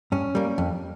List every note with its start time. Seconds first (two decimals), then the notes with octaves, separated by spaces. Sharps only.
0.12 G2 C#4
0.35 G3 A#3
0.58 F2